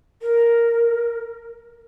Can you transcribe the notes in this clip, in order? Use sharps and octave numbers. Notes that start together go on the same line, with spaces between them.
A#4